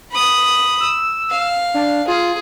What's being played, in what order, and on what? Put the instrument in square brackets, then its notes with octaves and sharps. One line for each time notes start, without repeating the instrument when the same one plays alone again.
[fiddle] B5 D#6
[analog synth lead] E6
[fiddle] F5
[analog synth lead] D4
[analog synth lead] F4 [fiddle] G#4